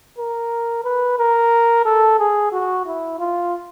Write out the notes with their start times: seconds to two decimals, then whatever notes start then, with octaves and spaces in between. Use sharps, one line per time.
0.18 A#4
0.85 B4
1.19 A#4
1.85 A4
2.19 G#4
2.52 F#4
2.86 E4
3.19 F4